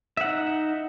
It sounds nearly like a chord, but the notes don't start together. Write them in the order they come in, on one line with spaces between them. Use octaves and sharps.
E5 F#5 D#4